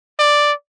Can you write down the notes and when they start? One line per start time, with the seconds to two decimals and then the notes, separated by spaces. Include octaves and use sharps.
0.19 D5